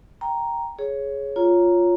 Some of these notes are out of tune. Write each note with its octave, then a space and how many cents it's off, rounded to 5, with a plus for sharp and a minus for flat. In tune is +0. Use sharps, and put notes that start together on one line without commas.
G5 +0 A#5 +0
G#4 +10 C#5 +0
F4 +5 C#5 +5 A#5 +0